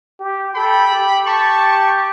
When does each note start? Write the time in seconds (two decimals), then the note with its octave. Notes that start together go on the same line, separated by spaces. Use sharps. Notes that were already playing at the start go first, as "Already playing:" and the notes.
0.20 G4
0.55 A4 G5 B5
0.92 G4
1.27 A5 C#6